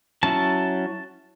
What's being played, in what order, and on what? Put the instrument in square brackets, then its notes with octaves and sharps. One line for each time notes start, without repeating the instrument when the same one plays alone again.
[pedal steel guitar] F#3 C#4 E4 A5